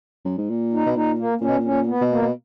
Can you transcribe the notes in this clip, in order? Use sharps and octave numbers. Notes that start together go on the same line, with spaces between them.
F#2
G#2
A#2
D#4
B2
A#2 D#4
A#3
A#2 C#4
B2
A#2
C#4
A#2
B3
B2
A#3
B2